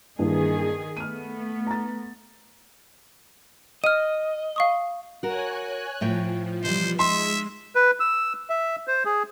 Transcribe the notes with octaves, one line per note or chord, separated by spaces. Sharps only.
G2 D#3 E3 A#3 G#4
A3 B3 F6 D#7
A#5 A6
D#5 F6 D#7
F5 C#6 D#6
F#4 A#4 C#5 G#5 F#6
A2 F3 A3 G5
B2 E3 G3 C5
G#3 D#4 E5 C6
B4
E6
E5
C5
G#4